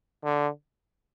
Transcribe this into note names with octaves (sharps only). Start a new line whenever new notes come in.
D3